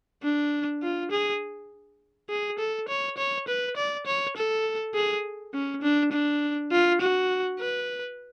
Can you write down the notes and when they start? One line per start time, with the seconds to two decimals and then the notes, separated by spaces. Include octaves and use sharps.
0.23 D4
0.83 F4
1.12 G#4
2.30 G#4
2.59 A4
2.89 C#5
3.18 C#5
3.48 B4
3.77 D5
4.07 C#5
4.37 A4
4.95 G#4
5.54 C#4
5.83 D4
6.12 D4
6.72 F4
7.01 F#4
7.60 B4